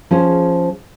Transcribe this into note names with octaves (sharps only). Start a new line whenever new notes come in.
F3 C#4 G#4 C5